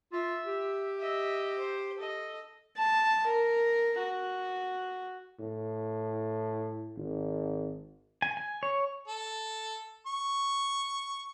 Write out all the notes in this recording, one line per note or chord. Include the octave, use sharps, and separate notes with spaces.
F4 E5
G4
D#5 E5
C5
A4 D#5
A5
A#4
F#4
A2
G#1
G#5
G#5
C#5
A4
C#6